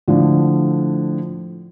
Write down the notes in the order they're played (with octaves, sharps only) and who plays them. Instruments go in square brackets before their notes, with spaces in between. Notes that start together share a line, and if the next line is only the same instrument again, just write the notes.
[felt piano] A2 D3 F3